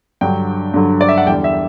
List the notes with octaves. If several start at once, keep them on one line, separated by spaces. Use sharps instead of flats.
G2 D3 F#3 G5
G2 D3 F#3
D5
E5
F#5
E2 D3 G3 G5
E5